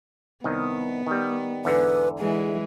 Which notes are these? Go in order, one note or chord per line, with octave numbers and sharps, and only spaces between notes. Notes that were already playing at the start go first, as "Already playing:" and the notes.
C2 D#3 B3 D#5
D#3 G3
E2 G#2 D3 B4
E3 G#3 G#4